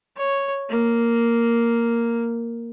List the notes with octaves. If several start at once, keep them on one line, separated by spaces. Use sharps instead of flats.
C#5
A#3